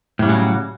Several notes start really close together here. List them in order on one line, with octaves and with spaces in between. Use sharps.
A2 G3 C#3 F#3